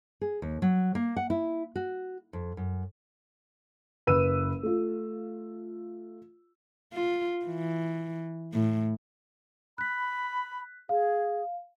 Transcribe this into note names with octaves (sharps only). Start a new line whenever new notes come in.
G#4
D#2
F#3
A#3
F#5
E4
F#4
F2
F#2
F#1 B4 E6 D#7
A3 F4
F4
E3
A2
B5 F#6 B6
G#4 F5